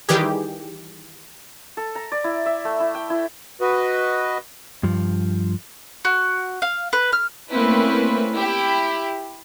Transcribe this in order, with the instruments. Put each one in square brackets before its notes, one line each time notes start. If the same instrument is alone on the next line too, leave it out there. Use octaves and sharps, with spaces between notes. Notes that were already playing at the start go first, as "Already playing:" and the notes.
[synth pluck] D#3 E3 G3 G4 G#4
[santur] A4
A#5
D5
E4
E5
A3
E4
G5
E4
[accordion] F#4 B4 D#5
[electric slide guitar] G2 F3
[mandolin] F#4
F5
B4
F6
[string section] A3 A#3 C4 C#4 E4 B4
E4 G4